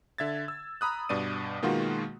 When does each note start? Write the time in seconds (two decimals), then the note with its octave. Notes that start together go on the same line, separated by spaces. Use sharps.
0.18 D3 E5 G#6 A6
0.48 E6
0.81 A#5 B5 D#6 F#6
1.09 G2 B2 D5 D#7
1.62 B2 D#3 G#3 A#3 F4 F#4